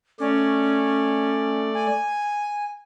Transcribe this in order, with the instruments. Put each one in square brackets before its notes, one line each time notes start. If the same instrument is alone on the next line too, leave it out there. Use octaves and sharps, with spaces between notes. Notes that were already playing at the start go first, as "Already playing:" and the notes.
[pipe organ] A3 D5 [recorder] C#4
[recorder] G#5